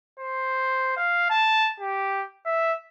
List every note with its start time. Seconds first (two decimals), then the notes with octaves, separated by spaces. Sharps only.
0.19 C5
0.97 F5
1.30 A5
1.80 G4
2.46 E5